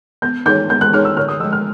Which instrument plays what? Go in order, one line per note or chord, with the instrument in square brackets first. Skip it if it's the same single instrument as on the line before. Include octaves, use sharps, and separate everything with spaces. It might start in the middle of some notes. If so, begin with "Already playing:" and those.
[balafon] B3 [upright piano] G6
[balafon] D#4 G#4 C#5 [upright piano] G6
[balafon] B3 [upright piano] G6
[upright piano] F#6
[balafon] D#4 G#4 C#5 [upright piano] F6
[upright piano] E6
[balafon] D3 [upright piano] F6
[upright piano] D#6
[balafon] F3 G#3 [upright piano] E6
[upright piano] F6